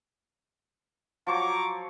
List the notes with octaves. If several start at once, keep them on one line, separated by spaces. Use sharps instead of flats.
F3 F#3 C#5 A#5 C#6 D6